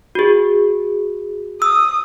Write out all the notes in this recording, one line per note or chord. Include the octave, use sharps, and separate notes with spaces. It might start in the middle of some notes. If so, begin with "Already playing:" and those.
F#4 G#4
D#6 E6